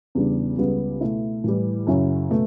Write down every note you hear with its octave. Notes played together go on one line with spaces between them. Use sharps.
E2 C#3 G3 D4
C#2 C#3 G3 B3
B2 A3 E4
A2 E3 G3
F#2 C#3 F#3 C#4 E4
B2 A3